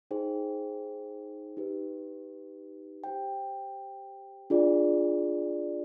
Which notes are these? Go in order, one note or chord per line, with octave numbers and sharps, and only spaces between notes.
D#4 G#4 C5 G5
D#4 G4 B4
G4 C5 G5
D4 F4 G#4 D5